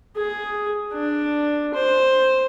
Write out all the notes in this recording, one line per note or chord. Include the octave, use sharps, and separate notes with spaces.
G#4
D4
C5